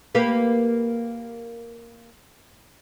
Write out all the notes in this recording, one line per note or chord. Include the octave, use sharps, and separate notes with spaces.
A#3 G4 B4